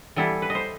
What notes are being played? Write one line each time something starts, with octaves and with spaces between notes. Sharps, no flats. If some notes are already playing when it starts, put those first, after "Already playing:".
E3 G3 B3 E4 A4
B4
D#5
C5